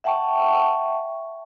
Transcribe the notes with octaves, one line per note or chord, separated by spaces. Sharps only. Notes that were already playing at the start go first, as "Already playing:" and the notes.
E5 F#5 G5 A5 C#6